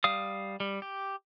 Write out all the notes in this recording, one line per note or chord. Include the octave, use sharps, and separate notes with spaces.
G3 F5 D#6
G3
G4